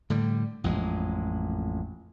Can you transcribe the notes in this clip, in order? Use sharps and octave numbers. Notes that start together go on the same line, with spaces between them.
A2 D3 G3
A1 F2 A#2 G#3